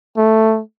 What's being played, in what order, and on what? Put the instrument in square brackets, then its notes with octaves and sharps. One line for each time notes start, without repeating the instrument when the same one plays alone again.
[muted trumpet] A3